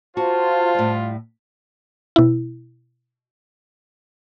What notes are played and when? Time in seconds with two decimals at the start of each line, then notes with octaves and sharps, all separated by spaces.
0.17 F4 F#4 C5 A5
0.75 A2 G3
2.16 B2 E4